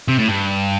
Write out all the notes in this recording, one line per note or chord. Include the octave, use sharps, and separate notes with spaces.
C3
A2
G2